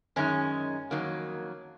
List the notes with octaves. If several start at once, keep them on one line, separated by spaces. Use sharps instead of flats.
F#2 D#3 G#3 C#4
F2 D#3 F#3 A#3